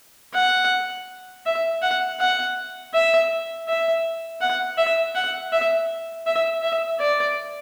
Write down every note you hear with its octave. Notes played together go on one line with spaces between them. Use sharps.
F#5
E5
F#5
F#5
E5
E5
F#5
E5
F#5
E5
E5
E5
D5